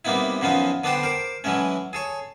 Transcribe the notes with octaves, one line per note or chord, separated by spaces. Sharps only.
C3 G3 A#3 B3 D#4 E4
F#2 C#3 F3 B3 D#4 F4
D3 B3 D4 A4 C5 G5
A#4 C5 D6
E3 F#3 G#3 A3 C#4
G#4 A4 C#5